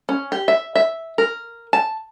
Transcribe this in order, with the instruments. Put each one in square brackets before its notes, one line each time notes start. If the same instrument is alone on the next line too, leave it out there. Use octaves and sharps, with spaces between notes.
[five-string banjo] C#4
G4
E5
E5
A#4
A5